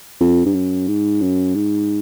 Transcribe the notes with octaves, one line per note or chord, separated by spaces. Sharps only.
F2
G2
F#2
G#2
F#2
G#2